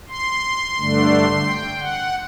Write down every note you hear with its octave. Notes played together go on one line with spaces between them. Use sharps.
C6
G2 D3 A3 D4
G5
F#5